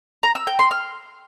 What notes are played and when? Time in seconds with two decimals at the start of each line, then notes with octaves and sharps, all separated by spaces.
0.23 A#5
0.35 E6
0.47 G5
0.59 C6
0.71 F6